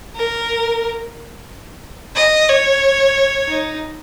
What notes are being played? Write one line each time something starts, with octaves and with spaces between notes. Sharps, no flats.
A#4
D#5
C#5
D#4